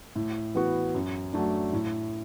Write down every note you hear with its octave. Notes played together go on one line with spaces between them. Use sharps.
A2
E3 B3 F#4
F#2
F#3 A3 D4
A2